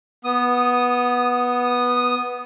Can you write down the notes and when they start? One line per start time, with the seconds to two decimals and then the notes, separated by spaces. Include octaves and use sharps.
0.24 B3 D#6